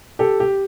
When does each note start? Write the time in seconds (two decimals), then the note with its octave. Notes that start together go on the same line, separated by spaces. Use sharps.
0.19 G4 A4
0.40 G4